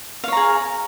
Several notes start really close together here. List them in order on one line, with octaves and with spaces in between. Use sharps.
F5 C#5 A#5 G#4